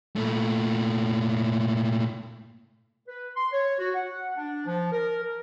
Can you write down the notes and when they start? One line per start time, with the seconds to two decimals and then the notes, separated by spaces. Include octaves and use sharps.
0.16 A#2 A3
3.07 B4
3.36 C6
3.52 C#5
3.79 F#4
3.95 F#5
4.37 D4
4.66 F3
4.92 A#4
5.22 A#4